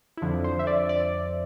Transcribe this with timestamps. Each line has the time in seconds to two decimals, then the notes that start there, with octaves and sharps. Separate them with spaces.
0.17 E4
0.22 F2 D3 F3 D4
0.44 C5
0.59 E5
0.67 D5
0.89 D5